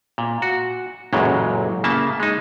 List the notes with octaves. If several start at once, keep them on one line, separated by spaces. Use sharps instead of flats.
A#2
F#4
A1 F#2 A#2 C#3 F#3 G#3
C#3 A#3 E5 A5
G#3 D#4